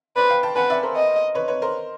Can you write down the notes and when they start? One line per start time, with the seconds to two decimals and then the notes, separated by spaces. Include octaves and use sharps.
0.16 B4 C5 D5
0.29 F5 G5
0.43 G5 A5
0.56 B4 F#5 G#5
0.70 D5 E5
0.83 A#4 C5
0.96 D#5
1.35 B4 C#5
1.48 B4 C#5
1.62 A#4 C5